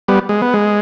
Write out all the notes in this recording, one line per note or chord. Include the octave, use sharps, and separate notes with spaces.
G3 B3
G#3
B3
G#3